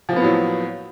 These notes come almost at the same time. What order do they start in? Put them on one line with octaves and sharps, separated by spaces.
F3 A#3 B3 A2 F#3